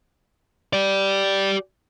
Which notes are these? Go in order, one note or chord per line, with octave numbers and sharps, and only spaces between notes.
G4 D5